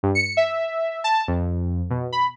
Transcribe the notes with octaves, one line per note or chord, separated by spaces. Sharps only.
G2
C#7
E5
A5
F2
B2
B5